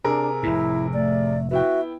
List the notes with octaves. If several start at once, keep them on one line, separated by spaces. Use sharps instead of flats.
C3 D4 G#4 A#4
F1 A2 E4
A3 D5
B3 E4 F#4 E5 G5